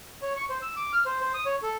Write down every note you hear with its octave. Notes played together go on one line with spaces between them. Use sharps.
C#5
C#6
C5
E6
D6
F6
C5
C5
D#6
C#5
A4